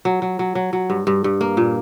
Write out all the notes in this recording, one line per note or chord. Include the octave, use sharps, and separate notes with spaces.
F#3
F#3
F#3
F#3
F#3
G2
G2
G2
A#3
A#2